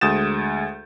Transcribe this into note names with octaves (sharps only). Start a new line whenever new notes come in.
D2 G#3 D#6 G6 A6 E7